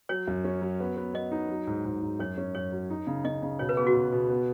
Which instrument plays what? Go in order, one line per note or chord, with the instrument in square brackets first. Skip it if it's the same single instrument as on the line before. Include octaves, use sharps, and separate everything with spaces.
[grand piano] F#3 [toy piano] C#5
[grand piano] F#2
C#4
F#3
B3
B3
[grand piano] B3 [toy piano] D#5
[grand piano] D#4
F#3
G#2
G#2
G#2
[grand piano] F#2 [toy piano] C#5
[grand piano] C#4
[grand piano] F#2 [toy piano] C#5
[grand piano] F#3
D#4
C#3
[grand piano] C#3 [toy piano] D#5
[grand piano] C#3
[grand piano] B2 [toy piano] C#5
[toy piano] B4
[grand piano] B3 [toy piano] G#4
[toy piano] F#4
[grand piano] B2
B2
B3